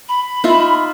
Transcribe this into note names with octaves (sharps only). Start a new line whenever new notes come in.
B5
D#4 F4 E5